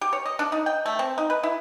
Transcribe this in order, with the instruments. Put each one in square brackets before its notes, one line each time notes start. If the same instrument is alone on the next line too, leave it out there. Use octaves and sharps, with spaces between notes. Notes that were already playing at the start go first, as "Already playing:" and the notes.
[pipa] G4
C#5
D#5
D4
D#4
G5
A3
C4
D#4
B4
E4